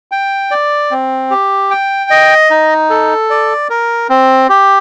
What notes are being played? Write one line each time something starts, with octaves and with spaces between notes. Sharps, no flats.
G5
D5
C4
G4
G5
D#5
D#4
A4
D5
A#4
C4
G4